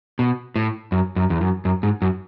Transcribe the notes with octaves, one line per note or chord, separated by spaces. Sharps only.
B2
A2
F#2
F#2
E2
F#2
F#2
G#2
F#2